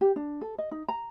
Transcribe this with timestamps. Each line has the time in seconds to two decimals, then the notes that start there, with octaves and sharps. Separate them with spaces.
0.01 G4
0.16 D4
0.41 A4
0.58 D#5
0.71 D#4
0.88 A#5